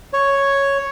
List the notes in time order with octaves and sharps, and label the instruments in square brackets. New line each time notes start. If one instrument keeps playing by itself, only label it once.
[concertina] C#5